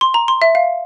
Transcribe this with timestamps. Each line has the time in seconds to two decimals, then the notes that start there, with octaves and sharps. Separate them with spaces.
0.01 C6
0.14 A#5
0.28 C6
0.42 E5
0.55 F5